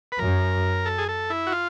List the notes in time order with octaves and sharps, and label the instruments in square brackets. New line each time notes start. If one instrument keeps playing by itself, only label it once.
[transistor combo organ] B4
[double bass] F#2 [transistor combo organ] A#4
[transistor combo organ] A4
G#4
A4
E4
F#4
F4